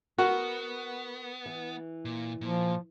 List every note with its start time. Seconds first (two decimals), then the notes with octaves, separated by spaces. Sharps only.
0.18 B3 F#4 A#4
1.46 E3
2.05 A#2
2.41 A#2 F3